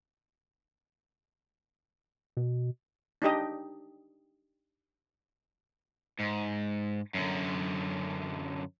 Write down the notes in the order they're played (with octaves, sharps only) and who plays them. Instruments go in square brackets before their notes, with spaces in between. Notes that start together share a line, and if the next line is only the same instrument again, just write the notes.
[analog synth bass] B2
[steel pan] D4 D#4 G4 D#5
[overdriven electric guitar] G#2
F#2 D3